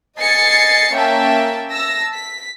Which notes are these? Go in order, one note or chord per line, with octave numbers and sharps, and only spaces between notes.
D#5 G#5 A6 C7 C#7
A#3 C#4 E5 G5 A5
A5 E6 A#6
B6